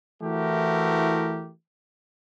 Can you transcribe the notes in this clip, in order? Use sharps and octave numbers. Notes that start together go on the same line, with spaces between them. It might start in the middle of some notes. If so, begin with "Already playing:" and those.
E3 A3 E4 F#4 G4 A#4